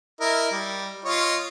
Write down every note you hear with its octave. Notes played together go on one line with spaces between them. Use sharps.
E4 A#4 D#5
G3
F4 C#5 D#5